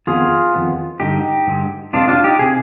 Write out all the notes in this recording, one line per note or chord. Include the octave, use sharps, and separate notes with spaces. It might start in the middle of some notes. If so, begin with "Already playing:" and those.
F2 D#3 B3 F4 G#4
F2 D#3 B3
G2 D3 G#3 D#4 G4
G2 D3 G#3
F2 C3 F3 G#3 D4 F4
D4 F4
D#4 G4
C3 G#4